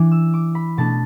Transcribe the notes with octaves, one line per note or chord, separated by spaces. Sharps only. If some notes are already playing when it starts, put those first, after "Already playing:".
Already playing: E3 D4 D6
E6
D6
B5
B2 A3 D4 A5